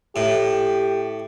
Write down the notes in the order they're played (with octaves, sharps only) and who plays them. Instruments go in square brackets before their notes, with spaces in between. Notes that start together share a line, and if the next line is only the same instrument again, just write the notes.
[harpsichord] A2 [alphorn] G4